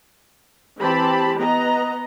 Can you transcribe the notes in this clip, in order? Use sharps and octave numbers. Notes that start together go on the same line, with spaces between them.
E3 C4 G4 A5 B5
B3 D#5 A#5